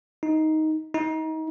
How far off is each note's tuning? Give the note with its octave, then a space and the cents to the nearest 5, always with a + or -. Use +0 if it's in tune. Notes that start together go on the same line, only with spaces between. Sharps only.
D#4 +10
D#4 +30